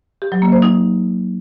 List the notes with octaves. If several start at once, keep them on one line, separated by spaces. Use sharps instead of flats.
G4
F#3
A#3
C5
D#4